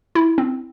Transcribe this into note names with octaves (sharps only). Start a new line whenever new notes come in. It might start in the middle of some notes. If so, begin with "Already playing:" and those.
E4
C4